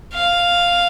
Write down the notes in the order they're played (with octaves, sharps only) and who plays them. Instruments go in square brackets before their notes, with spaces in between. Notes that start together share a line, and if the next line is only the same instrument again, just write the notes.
[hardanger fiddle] F5